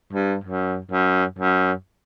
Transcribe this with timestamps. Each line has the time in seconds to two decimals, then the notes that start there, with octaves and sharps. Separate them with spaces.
0.13 G2
0.44 F#2
0.91 F#2
1.39 F#2